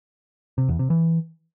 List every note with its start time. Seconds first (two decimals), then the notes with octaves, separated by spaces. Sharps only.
0.58 C3
0.69 E2
0.79 C3
0.90 E3